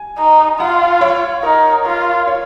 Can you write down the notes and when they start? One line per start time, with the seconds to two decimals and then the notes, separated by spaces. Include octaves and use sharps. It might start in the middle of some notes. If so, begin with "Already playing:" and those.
Already playing: G#5
0.18 D#4
0.59 F4 F#5
1.01 C#5
1.43 D#4 A#4
1.85 F4 A#4
2.27 C#5